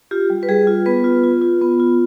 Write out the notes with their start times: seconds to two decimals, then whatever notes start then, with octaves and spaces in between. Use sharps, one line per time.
0.11 F4 G4
0.30 G3
0.43 B4
0.48 G3 G#4
0.67 F4
0.86 B3 B4
1.04 F4
1.24 F4
1.42 F4
1.61 B3
1.80 F4